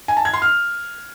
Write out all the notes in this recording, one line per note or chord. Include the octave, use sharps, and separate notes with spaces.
G#5
A5
G#6
C6
F6